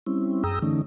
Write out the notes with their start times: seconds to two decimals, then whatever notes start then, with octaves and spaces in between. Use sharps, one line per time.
0.07 G3 C4 C#4 E4
0.44 F#2 G#4 G5 A#5 D#6 E6
0.62 D3 E3 A3 C#4 D#4